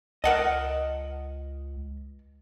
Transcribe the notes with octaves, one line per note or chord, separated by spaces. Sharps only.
C#2 A#4 D#5 F#5 A5